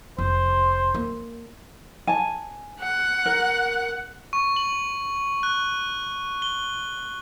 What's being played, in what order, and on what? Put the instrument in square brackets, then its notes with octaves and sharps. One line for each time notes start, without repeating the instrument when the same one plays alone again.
[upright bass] F1 [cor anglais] C5
[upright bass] A#3
[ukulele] G#5 A5
[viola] F#5
[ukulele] A#4
[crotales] C#6
F#7
F#6
G7